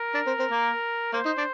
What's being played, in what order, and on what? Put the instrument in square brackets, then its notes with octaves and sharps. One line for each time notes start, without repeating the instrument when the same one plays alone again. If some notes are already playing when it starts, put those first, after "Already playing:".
Already playing: [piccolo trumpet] A#4
[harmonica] D4
C4
C4
A#3
[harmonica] A#3 [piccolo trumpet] C5
[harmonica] D#4
D4